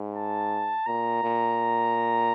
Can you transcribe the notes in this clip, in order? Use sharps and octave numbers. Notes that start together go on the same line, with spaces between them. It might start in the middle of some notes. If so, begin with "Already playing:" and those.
Already playing: G#2
A5
A#2 A#5
A#2